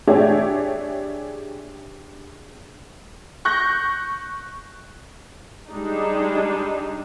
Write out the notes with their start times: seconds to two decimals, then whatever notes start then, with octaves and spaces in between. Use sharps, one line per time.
0.07 D4 G4 G#4 C#5 D5 E5
3.45 C#6 F#6 G6 A#6
5.69 G3 G#3 D4 D#4